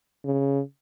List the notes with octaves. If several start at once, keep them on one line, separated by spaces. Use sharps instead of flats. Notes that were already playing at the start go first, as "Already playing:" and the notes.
C#3